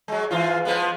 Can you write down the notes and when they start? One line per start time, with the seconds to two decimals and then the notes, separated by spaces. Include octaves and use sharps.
0.08 F#3 G#3
0.31 G#2 E3 F4
0.65 F3 G#3 B3